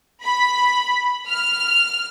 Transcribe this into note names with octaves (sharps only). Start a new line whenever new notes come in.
B5
F6